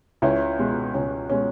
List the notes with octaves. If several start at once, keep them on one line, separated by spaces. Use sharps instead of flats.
C#2 C#4 E4
B2 G#3
C#2 C#4
B2 G#3 C#4